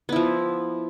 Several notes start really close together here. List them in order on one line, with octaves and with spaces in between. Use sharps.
B3 E4 F3